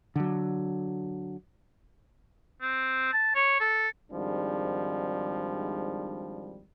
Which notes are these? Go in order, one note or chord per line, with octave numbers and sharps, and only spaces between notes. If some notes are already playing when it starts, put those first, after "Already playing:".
D3 F#3
C4
A5
C#5
A4
G#1 G#2 F3 G3 D4